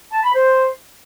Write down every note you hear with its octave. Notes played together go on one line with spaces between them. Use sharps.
A5
B5
C5